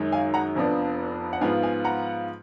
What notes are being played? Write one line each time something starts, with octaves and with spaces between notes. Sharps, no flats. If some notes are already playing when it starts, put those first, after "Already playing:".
Already playing: F#2 D#3 G#3 D#4
F5 G#5
F#5 A#5
F1 F2 F3 B3 D4
F#5
G#2 F3 B3 F4 F5 G#5
F5 G#5
F#5 A#5